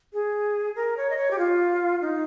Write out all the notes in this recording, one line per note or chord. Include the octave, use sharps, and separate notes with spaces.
G#4
A#4
C#5
D#5
C#5
G4
F4
D#4